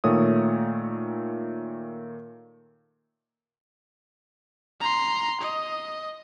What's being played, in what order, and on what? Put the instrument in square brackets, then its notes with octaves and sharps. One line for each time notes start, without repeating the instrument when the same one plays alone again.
[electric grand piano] A#2 D#3 A3 C#5 D#6
[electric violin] A#5 C6
D#5